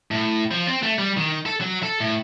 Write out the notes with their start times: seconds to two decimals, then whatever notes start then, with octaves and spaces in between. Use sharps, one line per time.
0.11 A2
0.51 F3
0.67 C4
0.83 A3
0.99 G3
1.17 D#3
1.46 A4
1.61 F#3
1.83 A4
2.00 A2